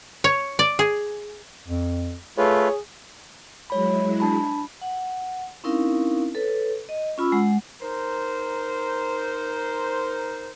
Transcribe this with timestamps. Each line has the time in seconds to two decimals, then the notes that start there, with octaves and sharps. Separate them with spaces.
0.24 C#5
0.59 D5
0.79 G#4
1.68 F2
2.38 A3 F4 G#4 B4 C#5
3.70 F#3 G#3 E4 C#5 B5
4.20 D4 A5 B5
4.81 F#5
5.64 C4 C#4 D#4 E4 A#4 F5
6.35 A4 B4 C#5
6.89 D#5
7.18 C#4 F4 B5 E6
7.32 G#3 F#5
7.81 D#4 A#4 C5